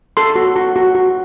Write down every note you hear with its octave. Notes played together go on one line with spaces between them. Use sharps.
A4 C6
F#4
F#4
F#4
F#4